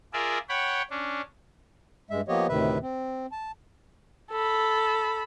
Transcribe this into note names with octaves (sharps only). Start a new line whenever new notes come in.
F4 G#4 A#4 D5 E5
C#5 F#5 G5 B5
C#4 D4
G2 G#3 E5
F3 A#3 B3 G4 C#5 D#5
D2 A2 C3 D#3 B4 E5
C4
A5
A4 B5